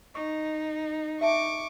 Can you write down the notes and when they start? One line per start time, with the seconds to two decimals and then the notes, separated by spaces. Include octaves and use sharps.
0.15 D#4 C#6
1.21 E5 A5 C#6 D6